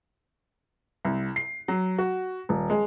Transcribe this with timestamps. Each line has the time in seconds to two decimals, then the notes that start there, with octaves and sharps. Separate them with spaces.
1.05 C2
1.36 C7
1.68 F#3
1.98 F#4
2.49 D#1
2.70 G#3